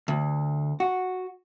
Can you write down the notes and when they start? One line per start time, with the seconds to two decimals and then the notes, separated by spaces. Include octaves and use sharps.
0.08 D2
0.80 F#4